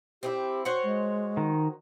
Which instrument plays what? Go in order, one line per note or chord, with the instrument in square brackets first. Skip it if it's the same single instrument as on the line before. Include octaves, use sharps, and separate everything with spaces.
[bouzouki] C4 D#4 E4 [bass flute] G4
[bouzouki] F#4 C5 C#5
[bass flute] G#3
[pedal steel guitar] D#3